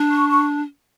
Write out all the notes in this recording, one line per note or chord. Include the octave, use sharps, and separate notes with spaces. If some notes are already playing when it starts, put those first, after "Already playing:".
Already playing: D4
C#6
C#6